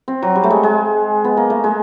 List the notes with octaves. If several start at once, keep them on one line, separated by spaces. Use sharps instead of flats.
C4
F#3
G3
A3
G#3
G#3
B3
A#3
A3
G#3